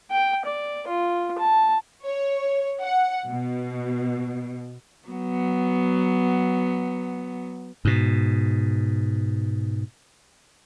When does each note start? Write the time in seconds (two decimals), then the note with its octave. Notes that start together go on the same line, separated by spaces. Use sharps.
0.11 G5
0.45 D5
0.88 F4
1.38 A5
2.06 C#5
2.82 F#5
3.30 B2
5.08 F#3 B3
7.85 G#2 B2